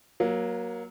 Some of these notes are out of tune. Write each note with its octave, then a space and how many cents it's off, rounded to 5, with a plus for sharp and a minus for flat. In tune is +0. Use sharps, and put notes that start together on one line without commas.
F#3 +0 A#3 +20